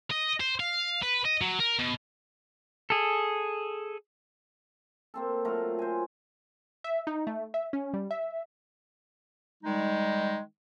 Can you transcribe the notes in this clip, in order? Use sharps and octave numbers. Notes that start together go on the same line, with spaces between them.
D#5
C5
F5
B4
D#5
F#3
A#4
B2
G#4 A4
A#3 C4 A4
F#3 A3 F4 A#4
C5 G#5
E5
D#4
A3
E5
C#4
G3
E5
D#3 G3 G#3 D#4